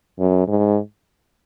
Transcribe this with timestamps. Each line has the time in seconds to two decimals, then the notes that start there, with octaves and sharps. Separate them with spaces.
0.19 F#2
0.48 G#2